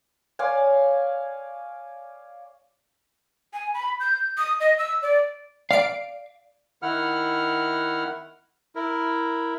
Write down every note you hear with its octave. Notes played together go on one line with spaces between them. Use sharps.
C#5 D5 F5 G#5
G#5
B5
G6
D#6
D#5
E6
D5
D5 F5 C7 D7
D#3 E4 F#5 F6
E4 A#4